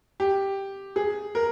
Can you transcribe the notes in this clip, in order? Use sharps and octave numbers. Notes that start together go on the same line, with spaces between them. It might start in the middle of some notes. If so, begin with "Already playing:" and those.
G4
G#4
A#4